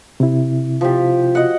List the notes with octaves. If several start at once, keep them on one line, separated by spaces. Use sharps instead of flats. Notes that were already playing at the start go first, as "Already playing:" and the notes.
C3 E4
F3 G4
F#4 D#5 F#5